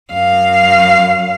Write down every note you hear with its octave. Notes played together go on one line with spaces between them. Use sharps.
F#2 F5